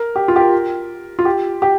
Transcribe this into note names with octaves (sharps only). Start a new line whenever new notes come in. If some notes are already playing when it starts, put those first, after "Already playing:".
Already playing: A#4
G4
F4
G4
A#4
F4
G4
G4